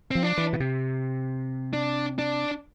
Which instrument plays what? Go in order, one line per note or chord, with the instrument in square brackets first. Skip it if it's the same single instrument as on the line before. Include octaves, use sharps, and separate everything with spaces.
[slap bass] F3 [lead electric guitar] C4
[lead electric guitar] D4
[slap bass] E3
B2
C3
[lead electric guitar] D4
D4